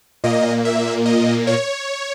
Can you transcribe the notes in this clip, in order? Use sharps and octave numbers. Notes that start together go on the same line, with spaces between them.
A#2 A#3 D#5
E5
D#5
C#5